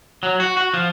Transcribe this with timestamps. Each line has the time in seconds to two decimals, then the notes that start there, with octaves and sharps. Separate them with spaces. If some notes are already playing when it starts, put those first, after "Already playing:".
0.23 F#3
0.40 F#4
0.57 F#4
0.74 F3